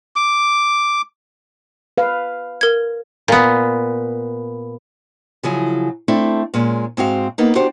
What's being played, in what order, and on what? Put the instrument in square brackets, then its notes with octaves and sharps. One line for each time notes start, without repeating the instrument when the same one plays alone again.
[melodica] D6
[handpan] B4 F5
[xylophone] A#4 G#6
[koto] A#2 B3
[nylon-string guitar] C#3 F3 F#3 E4 G#5
A3 C4 D4 E4 A4
A#2 G#3 C#4
G#2 C4 F#4 F5
A#3 B3 D#4
D4 F#4 G4 C5